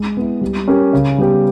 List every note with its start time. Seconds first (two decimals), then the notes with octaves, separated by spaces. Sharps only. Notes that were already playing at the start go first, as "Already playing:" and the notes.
Already playing: G#3
0.17 B3 E4
0.41 G3
0.68 C#4 G4 A#4
0.93 C#3
1.18 G3 B3 G4